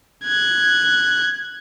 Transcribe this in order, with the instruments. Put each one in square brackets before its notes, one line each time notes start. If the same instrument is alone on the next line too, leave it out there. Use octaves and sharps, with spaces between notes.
[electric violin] F#6 G#6